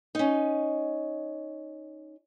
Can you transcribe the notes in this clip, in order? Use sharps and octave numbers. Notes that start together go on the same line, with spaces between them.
C#4 D#4